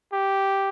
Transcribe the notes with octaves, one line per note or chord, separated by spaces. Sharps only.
G4